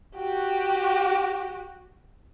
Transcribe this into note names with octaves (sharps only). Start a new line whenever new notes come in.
F#4 G4